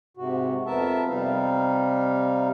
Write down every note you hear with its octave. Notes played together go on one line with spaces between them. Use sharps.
G#2 C3 F#4
F2 B3 A#4 E5 A5
C3 G3 D#4 F5